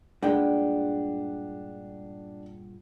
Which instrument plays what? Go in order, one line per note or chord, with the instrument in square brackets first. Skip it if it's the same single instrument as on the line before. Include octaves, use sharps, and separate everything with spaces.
[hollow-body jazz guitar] G2 A#2 G#3 [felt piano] D4 [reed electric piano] F#5 G5